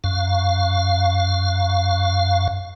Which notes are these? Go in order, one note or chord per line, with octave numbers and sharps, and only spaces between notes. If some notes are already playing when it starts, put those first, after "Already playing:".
F#2 F5